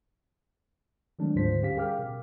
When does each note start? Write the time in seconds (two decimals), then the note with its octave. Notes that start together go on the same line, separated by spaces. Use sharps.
1.19 D#3 F#3 G#3 A3 C4 D4
1.35 D2 G#2 D3 F4 C5 B6
1.62 G3 C#4 G4 F5 B6
1.77 G#4 A#4 F5 G5 D6 F6
1.99 B2